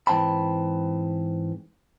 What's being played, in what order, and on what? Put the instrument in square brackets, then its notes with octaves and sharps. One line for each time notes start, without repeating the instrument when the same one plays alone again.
[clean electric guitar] G#2 E3 C4 G5 A5 B5